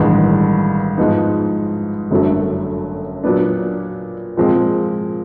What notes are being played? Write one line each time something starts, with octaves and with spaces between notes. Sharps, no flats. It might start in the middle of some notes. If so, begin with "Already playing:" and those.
Already playing: A1 G2 D#3 G#3 B3
G#2 F3 G#3 B3 D#4
G1 F#2 D3 F#3 A3
A#2 F#3 B3 D4
A#2 F3 G#3 C4